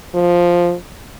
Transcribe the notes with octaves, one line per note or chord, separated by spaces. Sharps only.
F3